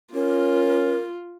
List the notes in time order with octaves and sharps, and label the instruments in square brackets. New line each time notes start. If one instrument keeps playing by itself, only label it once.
[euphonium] C#4 [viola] F4 [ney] A#4